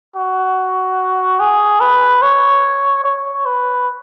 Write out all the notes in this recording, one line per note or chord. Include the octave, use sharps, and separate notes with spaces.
F#4
G#4
B4
C#5
C#5
B4